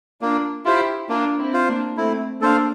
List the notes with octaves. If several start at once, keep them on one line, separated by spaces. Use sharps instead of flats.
A#3 D4 F4
E4 F4 G4 C5
A#3 D4 F4
C4 E4
F4 C5
A#3 D4
A3 C4 E4
A#3 D4 A4 C5 F5